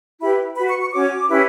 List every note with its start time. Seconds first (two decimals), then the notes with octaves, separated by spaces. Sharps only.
0.21 E4 G4 B4 B5
0.56 F#4 B4 B5
0.69 C#6
0.81 C#6
0.93 C#4 F#4 C#5 D6
1.29 C#4 E4 G4 B4